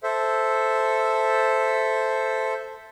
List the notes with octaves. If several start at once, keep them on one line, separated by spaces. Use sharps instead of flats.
A4 C5 E5